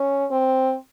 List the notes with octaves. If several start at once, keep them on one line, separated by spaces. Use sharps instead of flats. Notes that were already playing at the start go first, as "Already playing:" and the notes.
Already playing: C#4
C4